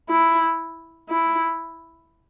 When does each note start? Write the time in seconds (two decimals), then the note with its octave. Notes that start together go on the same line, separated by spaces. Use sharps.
0.09 E4
1.09 E4